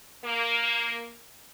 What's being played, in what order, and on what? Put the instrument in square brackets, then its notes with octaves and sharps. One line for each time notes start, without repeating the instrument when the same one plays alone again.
[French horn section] A#3